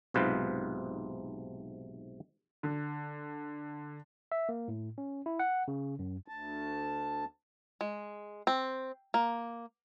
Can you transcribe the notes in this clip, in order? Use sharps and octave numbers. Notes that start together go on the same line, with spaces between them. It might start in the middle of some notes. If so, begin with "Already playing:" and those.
B1 G#2 C3 F4 B4
D3
E5
A#3
A2
C#4
E4
F#5
C#3
F#2
D2 A5
G#3
C4
A#3